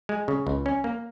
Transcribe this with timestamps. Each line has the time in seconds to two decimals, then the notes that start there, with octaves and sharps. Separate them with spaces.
0.09 G#3
0.28 C#3
0.47 C#2
0.66 C#4
0.84 A#3